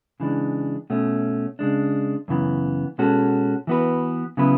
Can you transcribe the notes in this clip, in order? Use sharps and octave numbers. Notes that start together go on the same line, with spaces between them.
C#3 E3 G#3 D4
B2 A3 C#4
C#3 G#3 D4
F#2 C#3 E3 B3
B2 G#3 C#4 F#4 A4
E3 B3 F#4 B4
C#3 F#3 B3 E4 B4